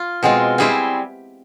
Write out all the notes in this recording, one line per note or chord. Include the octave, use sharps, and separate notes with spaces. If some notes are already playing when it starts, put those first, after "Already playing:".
Already playing: F4
B2 G#3 C4 F4
G3 C4 E4 G#4 C5